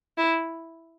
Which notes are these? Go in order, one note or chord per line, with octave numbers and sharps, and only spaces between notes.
E4